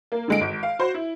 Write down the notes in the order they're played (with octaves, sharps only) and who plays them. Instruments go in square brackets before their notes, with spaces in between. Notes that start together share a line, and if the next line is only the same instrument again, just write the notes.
[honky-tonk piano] A#3
D3 G#3 D7
G#1
F5
F#4 C5
E4